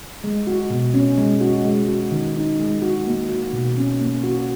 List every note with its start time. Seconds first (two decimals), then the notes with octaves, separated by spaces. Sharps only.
0.24 G#3
0.47 F#4
0.70 B2
0.94 C#4
1.18 G#3
1.41 F#4
1.65 G#3
1.88 F#4
2.11 D#3
2.36 D#4
2.59 G#3
2.82 F#4
3.07 A#3
3.29 F#4
3.53 B2
3.78 C#4
4.01 A#3
4.24 F#4